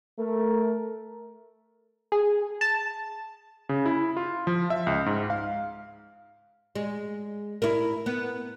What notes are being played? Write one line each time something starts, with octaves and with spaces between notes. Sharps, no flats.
A3 A#4
G#4
A5
C#3
E4
F4
F3
E5
C#2
G#2
F5
G#3
E4 A#4
B3